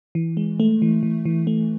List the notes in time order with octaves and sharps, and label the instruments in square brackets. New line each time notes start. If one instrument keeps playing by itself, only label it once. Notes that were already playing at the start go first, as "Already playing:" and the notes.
[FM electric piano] E3
G#3
A3
E3
E3
E3
A3